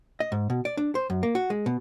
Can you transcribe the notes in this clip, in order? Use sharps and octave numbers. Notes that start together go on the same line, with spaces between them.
D#5
G#2
B2
D5
D4
C5
F#2
A#3
F#4
G#3
B2